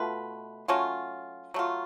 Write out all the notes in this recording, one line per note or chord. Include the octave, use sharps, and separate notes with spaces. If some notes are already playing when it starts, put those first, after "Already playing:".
Already playing: B2 A3 F4 B4
F#3 A3 C#4 F4
F#3 A3 F4